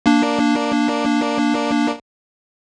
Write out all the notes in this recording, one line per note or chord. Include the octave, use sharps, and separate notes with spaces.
A#3 D4